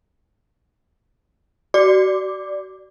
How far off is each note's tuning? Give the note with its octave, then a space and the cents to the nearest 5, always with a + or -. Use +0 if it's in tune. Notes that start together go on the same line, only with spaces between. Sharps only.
F#4 +35 D5 +0 D6 +0